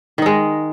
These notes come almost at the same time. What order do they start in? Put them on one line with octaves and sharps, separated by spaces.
D#3 D#4 G#3